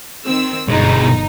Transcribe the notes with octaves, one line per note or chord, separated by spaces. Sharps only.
D#3 C4 E6
G1 B2 G#3 D#4